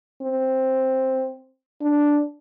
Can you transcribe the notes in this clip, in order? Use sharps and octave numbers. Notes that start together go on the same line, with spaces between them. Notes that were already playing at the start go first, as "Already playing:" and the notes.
C4
D4